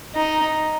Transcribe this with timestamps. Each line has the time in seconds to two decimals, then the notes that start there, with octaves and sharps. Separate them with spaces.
0.15 D#4